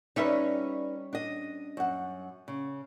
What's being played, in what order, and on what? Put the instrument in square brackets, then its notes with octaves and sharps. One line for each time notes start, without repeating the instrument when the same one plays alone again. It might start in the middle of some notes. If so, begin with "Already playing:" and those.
[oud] G3 C#4 E5 [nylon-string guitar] D#4 B4
[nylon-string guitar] D4 D#5
F#2 F#5
C#3